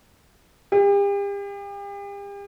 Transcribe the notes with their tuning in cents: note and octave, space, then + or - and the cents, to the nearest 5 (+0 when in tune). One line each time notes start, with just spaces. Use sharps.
G4 +40